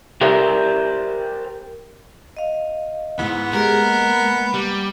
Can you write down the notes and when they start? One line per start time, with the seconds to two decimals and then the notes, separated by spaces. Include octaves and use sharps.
0.21 G4 A#4 C5 D5 E5
2.37 D#5 F5
3.19 D#2 G#2 B3 E4
3.53 G#3 G4 G#4 A#4
3.82 A#3
4.54 G3